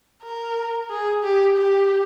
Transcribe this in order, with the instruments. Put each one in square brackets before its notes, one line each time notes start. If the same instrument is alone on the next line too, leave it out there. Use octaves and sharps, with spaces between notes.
[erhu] A#4
G#4
G4
G4